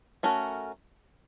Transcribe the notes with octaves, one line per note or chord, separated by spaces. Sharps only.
A3 C#4 F#4 A#4